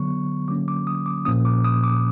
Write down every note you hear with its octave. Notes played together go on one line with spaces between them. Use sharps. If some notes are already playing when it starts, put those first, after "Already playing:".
Already playing: D3 F#3 B3 C#6
D3 F#3 A#3 C#4 D6
D6
D#6
D6
A#2 F3 A#3 C#4 D#6
D6
D#6
D6